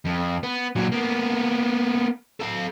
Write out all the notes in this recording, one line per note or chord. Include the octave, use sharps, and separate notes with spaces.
F2
B3
A#2 F#3
A#3 B3
A4 F5